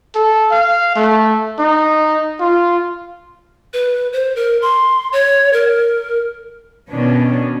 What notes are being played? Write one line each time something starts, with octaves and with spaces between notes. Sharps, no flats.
A4
F5
A3
D#4
F4
B4
C5
A#4
C6
C#5
A#4
B2 D#3 C#4 D4